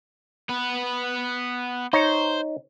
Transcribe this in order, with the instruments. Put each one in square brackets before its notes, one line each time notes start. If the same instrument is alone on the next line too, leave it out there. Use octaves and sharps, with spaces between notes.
[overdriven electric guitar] B3 B4
[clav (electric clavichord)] D#4 C#5 [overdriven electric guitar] C5